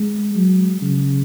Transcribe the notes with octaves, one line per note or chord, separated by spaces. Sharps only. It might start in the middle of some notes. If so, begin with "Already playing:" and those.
Already playing: G#3
F#3
C#3